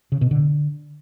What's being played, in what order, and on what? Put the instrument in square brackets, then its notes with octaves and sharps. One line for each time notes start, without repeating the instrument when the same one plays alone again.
[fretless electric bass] C#3
B2
D3